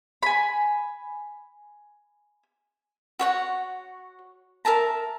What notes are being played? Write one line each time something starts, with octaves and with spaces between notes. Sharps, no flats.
G#5 B5
F#4 C#5 F#5
A#4 E5 A5 A#5